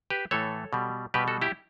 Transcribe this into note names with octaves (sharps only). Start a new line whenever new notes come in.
G4 B4
A2 E3 A3 A4 C#5
B2 G3
B2 G3 G4 B4
F#4 A4
E4 G4